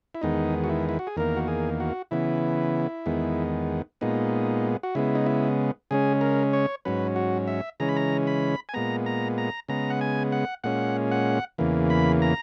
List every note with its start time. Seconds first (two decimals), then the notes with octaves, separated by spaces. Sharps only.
0.15 E4
0.22 E2 D#3 G#3 B3 D#4
0.64 F#4
0.70 E4
0.89 E4
0.99 F#4
1.07 G#4
1.16 E2 D#3 A#3 A#4
1.36 F#4
1.48 G#4
1.80 F#4
2.11 C#3 E3 B3 E4
3.06 E2 D#3 G#3 B3
4.01 A#2 G#3 B3 D#4
4.83 F#4
4.95 C#3 G#3 B3 E4
5.15 D#4
5.26 E4
5.91 C#3 G#3 C#4 G#4
6.21 A#4
6.53 C#5
6.85 G#2 F#3 C#4 B4
7.16 F#4
7.47 E5
7.80 C#3 E3 G#3 C#4 A#5
7.89 B5
7.96 A#5
8.27 B5
8.69 G#5
8.74 A#2 G#3 B3 A#5
9.06 A#5
9.38 A#5
9.69 C#3 G#3 B3 A#5
9.90 F#5
10.01 G#5
10.32 F#5
10.64 A#2 G#3 C#4 F#5
11.11 F#5
11.58 E2 C#3 E3 A#3
11.90 B5
12.22 A#5